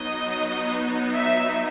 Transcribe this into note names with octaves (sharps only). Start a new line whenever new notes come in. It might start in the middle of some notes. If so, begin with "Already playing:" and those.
Already playing: F#3 B3 D#4 D#5
E5